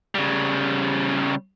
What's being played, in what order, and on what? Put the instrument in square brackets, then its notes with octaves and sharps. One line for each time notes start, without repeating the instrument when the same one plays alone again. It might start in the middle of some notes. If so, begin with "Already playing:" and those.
[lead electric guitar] C#3 G3